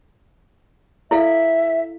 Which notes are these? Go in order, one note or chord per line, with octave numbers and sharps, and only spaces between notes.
E4 A4 E5 F5